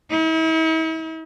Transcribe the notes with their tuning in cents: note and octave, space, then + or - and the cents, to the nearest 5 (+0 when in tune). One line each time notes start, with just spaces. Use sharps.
E4 -45